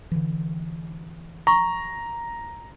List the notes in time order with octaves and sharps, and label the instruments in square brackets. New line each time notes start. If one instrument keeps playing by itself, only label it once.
[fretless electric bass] D3 E3
[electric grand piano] A#5 [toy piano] C#6